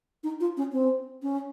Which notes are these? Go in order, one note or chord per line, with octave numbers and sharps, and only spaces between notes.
D#4
F4
C#4
C4
C#4